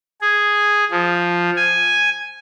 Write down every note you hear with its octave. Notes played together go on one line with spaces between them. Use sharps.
G#4
F3
G#5